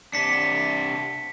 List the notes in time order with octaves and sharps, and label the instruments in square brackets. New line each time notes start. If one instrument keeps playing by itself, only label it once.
[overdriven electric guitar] C3 D4 [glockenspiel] B6 C#7